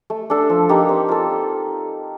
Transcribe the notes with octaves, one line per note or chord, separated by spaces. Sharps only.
A3
D4 A4
F3
A#3 D#4 G4
C4
F4 A4